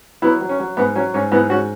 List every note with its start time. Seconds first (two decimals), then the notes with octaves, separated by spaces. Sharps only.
0.22 F#3 B3 E4
0.41 F#3
0.49 C#4
0.60 F#3
0.77 G#2 B3
0.95 F#3 C#4
1.14 G#2 C#4
1.32 G#2 B3 E4
1.50 G#2 C#4 F#4